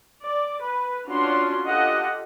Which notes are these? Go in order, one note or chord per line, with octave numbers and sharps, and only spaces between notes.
D5
B4
C#4 D4 F4 F#4 C6
F4 G4 A4 D#5 F#5